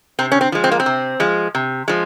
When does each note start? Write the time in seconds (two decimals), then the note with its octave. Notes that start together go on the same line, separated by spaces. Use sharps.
0.19 C3 C4
0.32 C#4
0.41 C4
0.52 F3 G#3
0.64 C4
0.72 A#3
0.80 C4
0.86 C3
1.20 F3 G#3
1.55 C3
1.88 F3 G#3